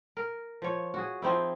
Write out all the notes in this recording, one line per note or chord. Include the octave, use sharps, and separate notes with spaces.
A#4
F3 C#5
F#4 G#4
F3 C4 D#4 E4